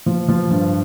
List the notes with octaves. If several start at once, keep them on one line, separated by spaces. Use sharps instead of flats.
F3
F3
G2